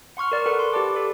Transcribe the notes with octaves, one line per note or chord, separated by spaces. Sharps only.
F#5 C6 C#6 F6
A#4 D5
A4 B4 F#5
C6
G4 B4 D5 A5 D6
A4 D5